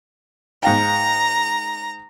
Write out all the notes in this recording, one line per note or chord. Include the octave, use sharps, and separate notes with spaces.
G#2 F5 G5 A#5